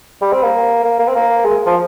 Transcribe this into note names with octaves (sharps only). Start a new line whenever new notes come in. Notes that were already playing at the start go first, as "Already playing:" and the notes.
G3
C4
A#3
A#3
A#3
C4
A#3
G#3
F3